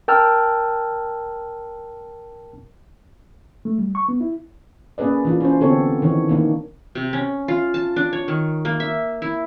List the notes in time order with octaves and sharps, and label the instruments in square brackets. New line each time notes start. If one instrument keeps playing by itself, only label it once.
[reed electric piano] A#4 G5 A5 E6 F6
A3
G3
C#6
B3
E4
[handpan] A#3 C#4 G#4 B4 D5
E3 D4 F4
C#4 C5
D3 B3 C4 G4 A4 C#5
D#3 E3 D4 C#5
D#3 A#3 D4
[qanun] C3
C#4
F4
A5
D4
C#5
D#3
A#3
E5
E4